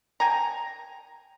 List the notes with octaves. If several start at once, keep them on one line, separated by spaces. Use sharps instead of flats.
G5 G#5 A#5